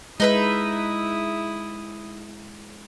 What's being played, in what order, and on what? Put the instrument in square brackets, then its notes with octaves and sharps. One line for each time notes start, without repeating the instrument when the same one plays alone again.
[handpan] G#3 [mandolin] D#4 B4 E5 [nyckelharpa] E4 D#6